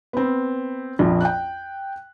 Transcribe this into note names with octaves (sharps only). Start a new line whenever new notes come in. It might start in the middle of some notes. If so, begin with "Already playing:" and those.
B3 C4
A#1 F2
G5 F#6